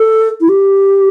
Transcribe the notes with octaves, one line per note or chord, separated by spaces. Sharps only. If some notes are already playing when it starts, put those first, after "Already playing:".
Already playing: A4
E4
G4